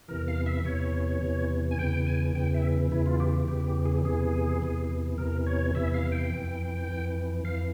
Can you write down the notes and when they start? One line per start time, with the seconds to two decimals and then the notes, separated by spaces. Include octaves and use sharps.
0.08 E2 C3 E3 A#4
0.28 F5
0.46 E5
0.65 E2 C3 E3 C#5
1.22 E2 C3 E3
1.71 G#5
1.78 E2 C#3 E3 G5
2.07 G#5
2.35 E2 C#3 E3 G5
2.54 E5
2.91 E2 C#3 E3 E4
3.06 F4
3.20 G4
3.48 E2 C#3 E3 G4
3.67 G4
3.86 G#4
4.05 E2 C3 E3 G#4
4.62 E2 C3 E3
5.18 E2 C3 E3 A#4
5.47 C#5
5.75 E2 C3 E3 E5
5.94 F5
6.12 G5
6.32 F2 E3
6.88 F2 E3
7.45 F2 E3 F5